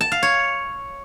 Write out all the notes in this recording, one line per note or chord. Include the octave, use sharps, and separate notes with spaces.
A5
F5
C#5